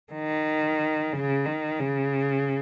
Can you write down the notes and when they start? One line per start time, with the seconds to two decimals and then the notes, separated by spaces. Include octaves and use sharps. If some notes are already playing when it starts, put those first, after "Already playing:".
0.13 D#3
1.13 C#3
1.46 D#3
1.79 C#3